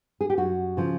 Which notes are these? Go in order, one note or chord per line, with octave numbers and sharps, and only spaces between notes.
G#4
G4
F#2 F#4
C#3 F3